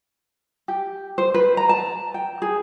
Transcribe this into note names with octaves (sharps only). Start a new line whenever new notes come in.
G4
C5
B4
A#5
A5
G5
G#4